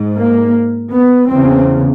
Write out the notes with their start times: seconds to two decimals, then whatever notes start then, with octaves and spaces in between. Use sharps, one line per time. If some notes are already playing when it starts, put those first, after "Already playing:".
Already playing: G#2
0.18 A#3
0.93 B3
1.29 E2 C#3 C4